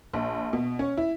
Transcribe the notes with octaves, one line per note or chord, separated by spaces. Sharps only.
A#1
B2
C#4
E4